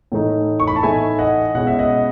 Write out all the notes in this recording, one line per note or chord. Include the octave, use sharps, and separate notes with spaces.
A2 E3 A3 D#4
C#6
B5
A5
A2 E3 A3 D#4 E5 G#5
D#5 F#5
B2 G#3 C#4 E4 F#5
E5
D#5 F#5